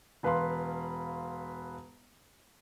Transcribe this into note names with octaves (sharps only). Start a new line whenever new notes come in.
E1 B4 F5 B5 C6